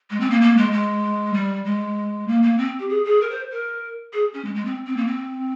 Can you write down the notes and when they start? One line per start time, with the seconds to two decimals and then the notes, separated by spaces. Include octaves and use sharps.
0.10 G#3
0.20 C4
0.30 A#3
0.41 A#3
0.57 G#3
0.72 G#3
1.34 G3
1.65 G#3
2.28 A#3
2.43 A#3
2.58 C4
2.80 G4
2.89 G#4
3.05 G#4
3.21 A#4
3.30 C5
3.51 A#4
4.13 G#4
4.34 C#4
4.45 G#3
4.55 G#3
4.65 C4
4.87 C4
4.97 A#3
5.06 C4